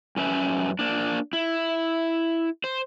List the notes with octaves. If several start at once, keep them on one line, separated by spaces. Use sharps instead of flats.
F#2 C#4 B4 E5
A#3 D4
E4
C5